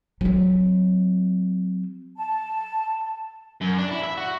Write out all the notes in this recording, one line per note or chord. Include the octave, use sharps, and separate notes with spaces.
F#3 C4
A5
F#2
D4
E4
E5
F#4